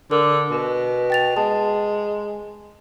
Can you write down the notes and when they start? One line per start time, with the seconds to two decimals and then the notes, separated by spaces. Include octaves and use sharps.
0.11 D3 A#4
0.51 B2
1.10 G5 A6 F7
1.37 G#3 A5